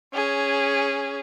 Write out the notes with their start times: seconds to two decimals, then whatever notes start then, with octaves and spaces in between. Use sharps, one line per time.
0.14 C#4 G#4